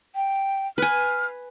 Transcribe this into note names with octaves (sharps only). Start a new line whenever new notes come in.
G5
B4 G#5 F6